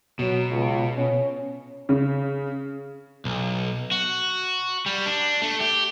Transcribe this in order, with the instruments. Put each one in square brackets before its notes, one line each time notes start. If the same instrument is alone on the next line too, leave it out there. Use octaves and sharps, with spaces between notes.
[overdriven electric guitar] B2 [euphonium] F#3
[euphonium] C#2
C#4
[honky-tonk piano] C#3
[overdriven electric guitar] B1
F#4
G3
D4
A3
G4